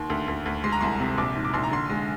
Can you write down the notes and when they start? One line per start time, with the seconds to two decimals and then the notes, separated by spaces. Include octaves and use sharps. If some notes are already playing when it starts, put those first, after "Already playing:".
Already playing: D#2 C6
0.10 D2
0.28 D2
0.46 D2
0.64 G#3 C6
0.72 A#5
0.81 C2 C6
1.00 C3
1.18 A#1 D6
1.35 G#2
1.45 D6
1.54 A#1 C6
1.64 A#5
1.71 D3 C6
1.90 G#3